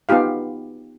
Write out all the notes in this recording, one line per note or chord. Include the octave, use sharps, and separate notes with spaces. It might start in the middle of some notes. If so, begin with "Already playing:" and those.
B3 D#4 F4 G4 F5